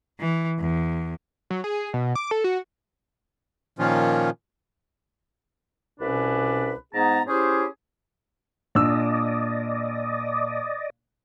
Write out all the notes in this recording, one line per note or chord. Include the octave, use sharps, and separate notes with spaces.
E3
E2
F#3
G#4
B2
D6
A4
F#4
A#2 D#3 F3 C#4 F4
C2 B2 C#4 D4 B4
G#2 B3 G#4 A5 A#5
C#4 E4 G4 G#4 C5
A#2 D4 D5 D#5 E6